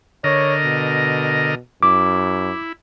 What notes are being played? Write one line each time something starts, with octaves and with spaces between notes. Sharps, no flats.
D3 A#4 C#5 D#5
B2
F#2 E4 D6